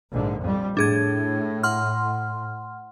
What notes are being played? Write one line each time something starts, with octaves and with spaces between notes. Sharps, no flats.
A#1 G#2 D3
F2 G3
A2 D4 G#4 G#6
F#5 C6 F6